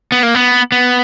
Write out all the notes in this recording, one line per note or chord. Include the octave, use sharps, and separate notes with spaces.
B3
A#3
B3
B3